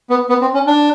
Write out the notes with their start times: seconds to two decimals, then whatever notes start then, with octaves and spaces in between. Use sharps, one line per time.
0.10 B3
0.29 B3
0.41 C4
0.54 C#4
0.67 D4